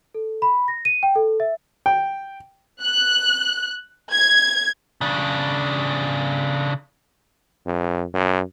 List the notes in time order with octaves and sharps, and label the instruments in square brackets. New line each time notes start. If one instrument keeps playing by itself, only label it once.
[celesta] A4
B5
A#6
D#7
G5
A4
E5
[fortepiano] G5
[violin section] F#6
G#6
[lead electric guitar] C#3 D4
[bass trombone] F2
F#2